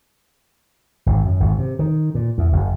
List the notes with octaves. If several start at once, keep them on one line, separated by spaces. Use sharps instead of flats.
G#1
F#2
G#1
C3
D#3
A#2
E2
F#1